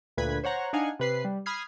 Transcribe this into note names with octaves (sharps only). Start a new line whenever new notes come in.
D2 A#2 B4 G#6 B6
C5 C#5 F#5 A#5
D4 D#4 F5 F#5 G#5
C3 B4 C7
G3
B5 D#6 F6 G#6 C7